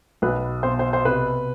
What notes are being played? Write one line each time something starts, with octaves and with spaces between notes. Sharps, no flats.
B1 B4
B2 C5
C5
C5
C3 B4